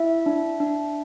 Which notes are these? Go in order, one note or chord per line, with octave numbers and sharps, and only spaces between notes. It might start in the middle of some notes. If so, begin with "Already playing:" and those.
Already playing: E4 E5
D4
D4